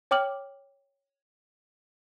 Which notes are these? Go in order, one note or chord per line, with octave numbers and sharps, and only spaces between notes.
C#5 G5 D6 F6 F#7